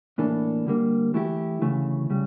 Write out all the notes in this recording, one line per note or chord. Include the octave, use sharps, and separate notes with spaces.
A2 E3 A#3 D4 A4
D3 G3 A#3
E3 A3 E4 G4
D2 C#3 E3 A3
C#3 G3